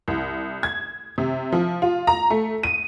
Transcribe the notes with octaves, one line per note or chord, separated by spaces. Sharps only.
C2
G#6
C3
F3
F4
A#5
A3
D#7